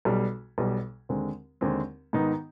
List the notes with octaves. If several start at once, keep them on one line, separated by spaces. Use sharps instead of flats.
B1 B2 G3
B1 B2 G3
D#2 D3 G#3 C4
D#2 D3 G#3 C4
G#2 D#3 B3 D#4